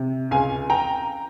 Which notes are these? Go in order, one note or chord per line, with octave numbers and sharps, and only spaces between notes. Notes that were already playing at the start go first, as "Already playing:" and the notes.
Already playing: C3
C#2 F5 G#5
G5 A#5